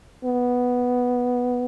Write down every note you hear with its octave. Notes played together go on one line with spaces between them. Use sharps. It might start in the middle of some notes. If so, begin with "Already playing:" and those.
B3